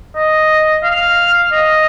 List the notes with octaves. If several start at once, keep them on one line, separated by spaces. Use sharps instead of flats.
D#5
F5
D#5